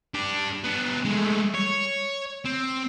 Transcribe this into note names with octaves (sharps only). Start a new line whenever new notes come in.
D4 G4
B3 D4
G#3 A3
C#5
C4